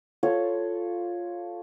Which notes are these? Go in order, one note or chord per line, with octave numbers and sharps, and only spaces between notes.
F4 A4 C#5